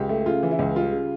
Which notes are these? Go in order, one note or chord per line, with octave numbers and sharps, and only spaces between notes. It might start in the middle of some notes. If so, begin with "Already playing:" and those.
Already playing: C#2 G4
A3
C#3 F4
E3
E4
C#2
G3 F4
C#3